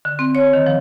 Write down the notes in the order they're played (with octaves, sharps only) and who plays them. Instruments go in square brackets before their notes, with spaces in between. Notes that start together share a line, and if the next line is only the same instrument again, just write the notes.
[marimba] D3
C4
C#5
D#3
F3